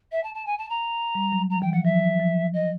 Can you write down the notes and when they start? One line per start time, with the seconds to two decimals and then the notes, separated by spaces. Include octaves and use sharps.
0.12 E5
0.23 A5
0.34 A5
0.46 G#5
0.58 A5
0.69 A#5
1.15 G3
1.32 F#3
1.50 F3 A#5
1.61 E3 G5
1.73 F3 F#5
1.84 F#3 E5
2.20 F3
2.54 D#5